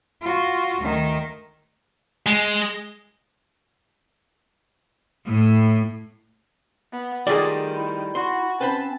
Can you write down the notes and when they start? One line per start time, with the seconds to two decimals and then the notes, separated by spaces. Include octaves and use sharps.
0.22 F4 F#4
0.81 D2 D#3
2.26 G#3
5.26 A2
6.92 B3
7.27 D#3 G3 A3 F4 G#4 D5
7.77 E4
8.15 F#4 C6
8.61 C4 C#4 B4 C5 A5 B5